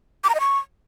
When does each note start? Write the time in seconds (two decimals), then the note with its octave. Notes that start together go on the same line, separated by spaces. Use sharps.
0.24 D6
0.29 A#5
0.35 D#5
0.40 C#6